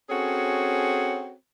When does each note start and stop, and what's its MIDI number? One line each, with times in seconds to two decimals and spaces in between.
0.09 1.33 60
0.09 1.33 61
0.09 1.33 66
0.09 1.33 68
0.09 1.33 69
0.09 1.33 73